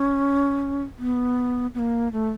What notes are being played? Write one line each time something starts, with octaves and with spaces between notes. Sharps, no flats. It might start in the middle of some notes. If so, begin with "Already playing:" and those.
Already playing: C#4
B3
B3
A#3
A3